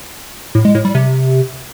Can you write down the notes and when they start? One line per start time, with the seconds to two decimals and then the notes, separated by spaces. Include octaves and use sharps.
0.55 A2
0.65 G#3
0.75 A2
0.85 G3
0.95 C3